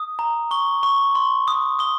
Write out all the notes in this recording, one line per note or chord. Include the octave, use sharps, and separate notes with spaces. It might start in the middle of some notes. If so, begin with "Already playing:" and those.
Already playing: D#6
A#5
C#6 G7
C#6
C6
D#6
D#6 G7